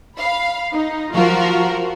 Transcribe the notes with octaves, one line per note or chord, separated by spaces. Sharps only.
F5 B5
D#4
F3 F4 F#4 A#4